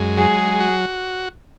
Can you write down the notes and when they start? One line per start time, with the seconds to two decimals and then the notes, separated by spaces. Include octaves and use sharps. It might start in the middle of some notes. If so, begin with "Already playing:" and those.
Already playing: F#2 G#3
0.17 F#3 G#4
0.60 F#4